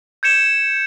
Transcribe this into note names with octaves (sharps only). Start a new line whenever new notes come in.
G6 G#6 C#7 E7